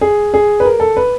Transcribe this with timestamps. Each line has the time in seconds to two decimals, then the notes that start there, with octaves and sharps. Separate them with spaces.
0.01 G#4
0.34 G#4
0.60 B4
0.65 A#4
0.80 A4
0.97 B4